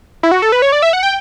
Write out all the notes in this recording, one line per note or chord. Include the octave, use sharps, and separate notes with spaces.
E4
F#4
A4
B4
C#5
D5
E5
F#5
G5